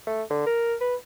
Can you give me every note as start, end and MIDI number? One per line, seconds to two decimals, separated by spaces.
0.07 0.23 57
0.31 0.43 50
0.47 0.75 70
0.81 0.95 71